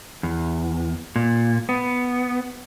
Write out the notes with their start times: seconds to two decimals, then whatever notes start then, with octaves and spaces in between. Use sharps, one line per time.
0.23 E2
1.16 A#2
1.69 B3